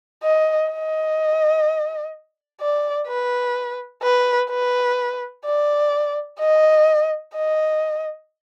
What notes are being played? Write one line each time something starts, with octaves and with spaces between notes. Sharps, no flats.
D#5
D#5
D5
B4
B4
B4
D5
D#5
D#5